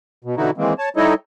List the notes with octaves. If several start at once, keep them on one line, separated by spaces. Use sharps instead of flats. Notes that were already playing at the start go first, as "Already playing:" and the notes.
B2
B2 D3 E3 D#4 E4 F#4
D#3 E3 G#3 A#3 C4
C#5 A5
G3 D#4 E4 A4 C#5 D#5